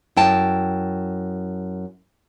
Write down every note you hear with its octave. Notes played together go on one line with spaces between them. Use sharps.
F#2 E4 G5 A5